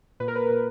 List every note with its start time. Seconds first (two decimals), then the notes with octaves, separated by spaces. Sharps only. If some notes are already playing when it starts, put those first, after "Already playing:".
0.20 A#2 B4
0.28 A#4
0.36 B4
0.50 A#2